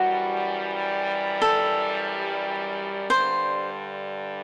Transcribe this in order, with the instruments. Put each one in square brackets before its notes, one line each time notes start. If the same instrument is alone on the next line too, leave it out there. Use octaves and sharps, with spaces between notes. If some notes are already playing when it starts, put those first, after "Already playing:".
Already playing: [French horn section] F#2 E3 G3 [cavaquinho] F#4
[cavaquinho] A4
[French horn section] G2 D3 G3 [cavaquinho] C5